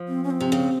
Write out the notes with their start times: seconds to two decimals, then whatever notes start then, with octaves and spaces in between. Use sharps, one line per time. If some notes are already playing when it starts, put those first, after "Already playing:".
Already playing: F3
0.08 C4
0.24 C#4
0.31 C4
0.41 C3
0.52 C#3